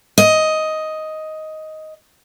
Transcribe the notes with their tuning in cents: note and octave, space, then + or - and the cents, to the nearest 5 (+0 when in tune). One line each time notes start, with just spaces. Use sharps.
D#5 +10